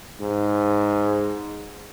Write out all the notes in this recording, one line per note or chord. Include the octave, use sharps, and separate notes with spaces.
G#2